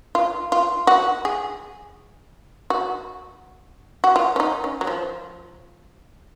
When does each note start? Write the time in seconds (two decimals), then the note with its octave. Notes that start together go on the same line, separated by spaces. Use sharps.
0.15 F4
0.52 F4
0.87 F#4
1.25 G#4
2.70 F#4
4.04 F#4
4.16 F4
4.36 C#4
4.40 D#4
4.64 C#4
4.81 F#3
4.87 F3